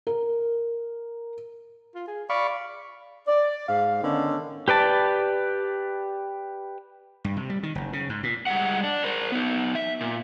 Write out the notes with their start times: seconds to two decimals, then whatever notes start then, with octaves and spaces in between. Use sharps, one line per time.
0.07 A#4
1.95 F4
2.08 G#4
2.30 D5 F5 B5 C#6
3.27 D5
3.68 G#2 F5
4.02 D3 D#3 B3 C#4
4.68 G4 B4 D5 A5
7.24 G2
7.36 C3
7.49 G3
7.63 D#3
7.75 F#1
7.93 C#3
8.09 G#2
8.23 A#2
8.46 G3 G#3 F#5
8.83 D4
9.04 A#4 C5
9.32 B3 D#4
9.75 E5
10.01 A#2